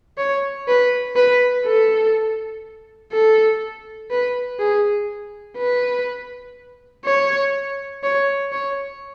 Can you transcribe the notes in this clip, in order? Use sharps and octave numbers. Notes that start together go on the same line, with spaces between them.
C#5
B4
B4
A4
A4
B4
G#4
B4
C#5
C#5
C#5